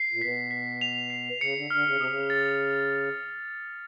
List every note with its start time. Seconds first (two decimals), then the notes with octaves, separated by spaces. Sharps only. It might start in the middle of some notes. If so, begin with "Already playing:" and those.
Already playing: C7
0.12 A#2
0.21 B2 B6
0.51 B6
0.81 F7
1.10 C7
1.41 C#3 C#7
1.56 D3
1.70 D3 F6
1.86 C#3
1.96 C3 D#6
2.07 C#3
2.30 A6